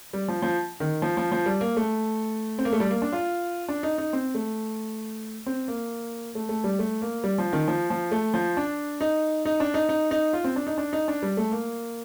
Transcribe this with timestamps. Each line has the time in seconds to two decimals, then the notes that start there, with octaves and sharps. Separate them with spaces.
0.13 G3
0.28 F3
0.42 F3
0.80 D#3
1.02 F3
1.17 F3
1.32 F3
1.46 G3
1.61 A#3
1.77 A3
2.59 C4
2.65 A#3
2.73 A3
2.80 G3
2.91 A#3
3.02 D4
3.13 F4
3.69 D4
3.83 D#4
3.98 D#4
4.13 C4
4.35 A3
5.46 C4
5.68 A#3
6.35 A3
6.49 A3
6.64 G3
6.79 A3
7.02 A#3
7.24 G3
7.38 F3
7.53 D#3
7.68 F3
7.90 F3
8.11 A3
8.34 F3
8.57 D4
9.01 D#4
9.45 D#4
9.60 D4
9.74 D#4
9.89 D#4
10.11 D#4
10.33 F4
10.44 C4
10.56 D4
10.67 D#4
10.78 D4
10.93 D#4
11.08 D4
11.23 G3
11.37 A3
11.52 A#3